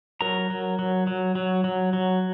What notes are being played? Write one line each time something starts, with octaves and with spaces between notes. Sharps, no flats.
F#3 A#4 A#5
F#3
F#3
F#3
F#3
F#3
F#3